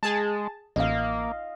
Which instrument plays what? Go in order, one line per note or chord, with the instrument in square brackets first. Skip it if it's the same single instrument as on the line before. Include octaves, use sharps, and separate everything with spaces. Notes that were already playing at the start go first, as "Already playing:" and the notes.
[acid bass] G#3 [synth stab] G#4 A5
[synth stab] A1 [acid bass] A#3 [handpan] D#5 F5